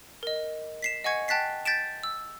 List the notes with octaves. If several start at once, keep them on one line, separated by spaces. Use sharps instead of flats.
A#4 D#5
B6 C7 E7
D#5 F#5 G#5 C#6 G#6 C#7
G5 A5 F#6 A6 B6 C7
G6 A6 B6 D7 E7
E6